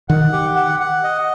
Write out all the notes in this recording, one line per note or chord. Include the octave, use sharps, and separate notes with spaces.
D#3 F#5
G4
F#5
F#5
D#5